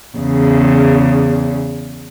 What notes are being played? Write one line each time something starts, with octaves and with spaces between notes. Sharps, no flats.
E2 C#3